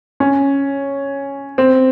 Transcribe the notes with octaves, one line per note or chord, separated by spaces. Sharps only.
C#4
C4